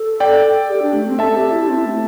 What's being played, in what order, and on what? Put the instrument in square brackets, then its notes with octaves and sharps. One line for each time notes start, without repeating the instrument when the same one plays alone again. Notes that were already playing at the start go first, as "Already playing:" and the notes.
Already playing: [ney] A4
[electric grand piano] D5 G5
[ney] G4
D4
A3
C4
[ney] A4 [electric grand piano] E5 A5
[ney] G4
E4
C4
C4
A3